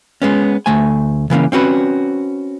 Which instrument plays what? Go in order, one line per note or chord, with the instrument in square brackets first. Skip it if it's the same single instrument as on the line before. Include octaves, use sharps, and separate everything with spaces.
[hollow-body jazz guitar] G#3 B3 C#4
D2 A3 G#5
C#3 E3 A#3 C#4
C4 C#4 F#4 B4